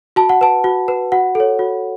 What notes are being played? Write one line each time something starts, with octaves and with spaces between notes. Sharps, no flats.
F#4 A5
F#5
B4 A5
F#4
B4
F#4 F#5
A4 C#5
F#4